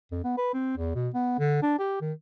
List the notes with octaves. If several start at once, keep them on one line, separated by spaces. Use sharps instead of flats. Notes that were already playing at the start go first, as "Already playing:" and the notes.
F2
B3
B4
C4
E2
B2
B3
D3
D4
G4
D#3